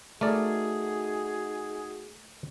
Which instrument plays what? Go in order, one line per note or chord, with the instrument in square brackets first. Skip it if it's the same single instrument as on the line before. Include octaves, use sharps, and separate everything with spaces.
[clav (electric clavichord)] A3 A#4 D5 [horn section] D#4 F#4 G#4